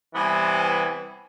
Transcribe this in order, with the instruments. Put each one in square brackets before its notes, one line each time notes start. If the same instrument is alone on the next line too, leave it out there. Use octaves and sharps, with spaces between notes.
[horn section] C3 E3 G3 B3 E4 G#5